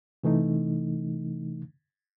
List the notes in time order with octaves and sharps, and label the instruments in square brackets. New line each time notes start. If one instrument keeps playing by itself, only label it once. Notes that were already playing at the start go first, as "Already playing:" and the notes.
[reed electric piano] C3 E3 A3 D#4